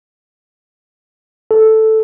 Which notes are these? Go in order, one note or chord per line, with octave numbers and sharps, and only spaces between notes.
A4